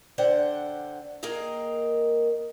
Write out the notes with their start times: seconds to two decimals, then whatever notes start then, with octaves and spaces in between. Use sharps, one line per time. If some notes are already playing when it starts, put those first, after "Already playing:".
0.18 D3 D4 C5 F#5 G5
1.23 A#3 G#4 A#4 D#5 G5